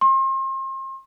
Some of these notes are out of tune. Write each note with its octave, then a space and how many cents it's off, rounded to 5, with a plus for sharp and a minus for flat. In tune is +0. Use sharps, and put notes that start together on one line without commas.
C6 +35